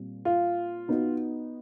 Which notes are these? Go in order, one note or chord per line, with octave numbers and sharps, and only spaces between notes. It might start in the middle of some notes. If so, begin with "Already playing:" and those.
Already playing: A#2 G3 C4
F4
B3 D#4 F#4